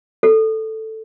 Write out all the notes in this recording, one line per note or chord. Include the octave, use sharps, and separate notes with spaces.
A4